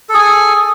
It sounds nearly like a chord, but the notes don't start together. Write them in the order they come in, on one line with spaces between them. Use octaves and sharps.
A4 G#4 G#5